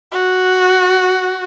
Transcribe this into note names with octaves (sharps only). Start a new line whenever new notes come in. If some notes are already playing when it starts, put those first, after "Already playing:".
F#4